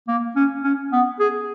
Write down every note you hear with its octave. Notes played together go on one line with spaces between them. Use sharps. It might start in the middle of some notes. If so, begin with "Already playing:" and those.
A#3
C#4
C#4
B3
G#4